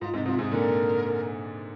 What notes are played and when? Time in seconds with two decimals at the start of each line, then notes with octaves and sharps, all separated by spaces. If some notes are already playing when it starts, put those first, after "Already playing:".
0.01 G#2 F4
0.13 G#2 C3 D#4
0.26 G#2 C3 F4
0.39 G#2 C3 G#4
0.51 A#2 D3 A#4